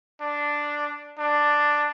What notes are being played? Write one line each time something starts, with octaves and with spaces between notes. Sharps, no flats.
D4
D4